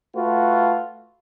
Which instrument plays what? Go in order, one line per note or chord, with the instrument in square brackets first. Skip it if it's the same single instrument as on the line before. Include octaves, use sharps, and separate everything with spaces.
[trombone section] A3 F4 F#4 B4